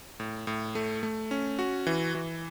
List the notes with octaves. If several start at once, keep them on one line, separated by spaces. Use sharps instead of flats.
A2
A2
A3
A3
C#4
F#4
E3
E3